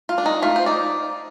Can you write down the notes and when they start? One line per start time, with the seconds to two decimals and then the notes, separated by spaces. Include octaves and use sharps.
0.09 F4
0.18 D4
0.26 D#4
0.42 A3 F4
0.56 C5
0.66 D#4 D5